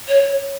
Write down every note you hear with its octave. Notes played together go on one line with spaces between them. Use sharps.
C#5